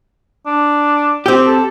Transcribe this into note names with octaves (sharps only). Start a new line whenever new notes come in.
D4
C4 G4
A4